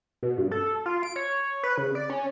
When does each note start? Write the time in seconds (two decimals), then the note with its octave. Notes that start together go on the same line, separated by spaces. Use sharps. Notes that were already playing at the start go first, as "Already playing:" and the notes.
0.23 B2
0.38 G2
0.51 A4
0.86 F4
1.03 D7
1.16 C#5
1.63 B4
1.78 C#3
1.95 D5
2.10 C#4